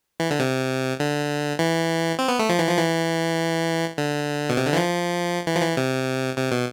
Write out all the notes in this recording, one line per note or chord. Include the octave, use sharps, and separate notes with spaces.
E3
D3
C3
D3
E3
C4
B3
A3
F3
E3
F3
E3
D3
B2
C3
D3
E3
F3
E3
F3
E3
C3
C3
B2